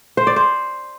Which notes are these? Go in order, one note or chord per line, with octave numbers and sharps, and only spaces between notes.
C5
D5
C5